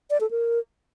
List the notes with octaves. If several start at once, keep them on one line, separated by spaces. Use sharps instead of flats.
D5
A4
A#4